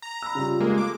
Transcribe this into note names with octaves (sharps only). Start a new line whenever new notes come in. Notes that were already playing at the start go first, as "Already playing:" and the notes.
A#5
B5 E6
C#3 G3 F4
G#3 A#3
A3 D6